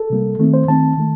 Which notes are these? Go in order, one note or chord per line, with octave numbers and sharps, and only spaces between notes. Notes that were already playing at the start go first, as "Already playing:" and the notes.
Already playing: A4
C3 G3 A#3
D#3 A3 C4
C5
D#3 A3 C4 A5
D#3 A3